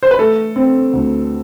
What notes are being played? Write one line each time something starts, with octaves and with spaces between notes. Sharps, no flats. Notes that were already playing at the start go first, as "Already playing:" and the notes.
C5
B4
A3 A4
C4
D2